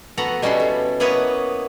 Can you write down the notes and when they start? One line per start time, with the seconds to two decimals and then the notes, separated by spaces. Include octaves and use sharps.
0.17 B3 F#4 A4 B4 F#5 A#5
0.42 B2 G3 C#4 E4 A4 C6
0.60 A4
1.00 A#3 B3 E4 B4 C#5 D#5